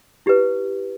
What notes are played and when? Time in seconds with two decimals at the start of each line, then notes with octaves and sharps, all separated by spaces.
0.26 E4 G4 B4